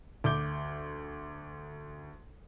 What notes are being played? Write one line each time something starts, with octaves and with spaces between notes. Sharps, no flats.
D2 D6 G6 G7